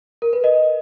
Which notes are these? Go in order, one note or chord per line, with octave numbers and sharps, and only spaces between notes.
A#4
B4
D#5